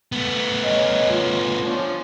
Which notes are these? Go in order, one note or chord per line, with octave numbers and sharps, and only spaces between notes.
A3 B3
C#4 D#5
F4
F3 C#4 D4